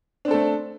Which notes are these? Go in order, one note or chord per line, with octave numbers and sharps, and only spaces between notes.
A3 C4 D4 A4